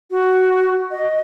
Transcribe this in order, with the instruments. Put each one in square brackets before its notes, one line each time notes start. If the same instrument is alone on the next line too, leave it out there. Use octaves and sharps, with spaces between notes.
[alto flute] F#4
D#5